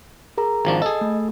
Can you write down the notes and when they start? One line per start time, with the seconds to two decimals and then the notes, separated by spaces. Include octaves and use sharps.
0.38 G#4 A#4 A#5
0.65 G#1 F3 D4
0.82 G#4 A4 D#5
1.01 A3